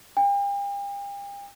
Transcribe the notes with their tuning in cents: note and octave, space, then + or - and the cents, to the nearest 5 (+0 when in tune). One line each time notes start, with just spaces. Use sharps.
G5 +40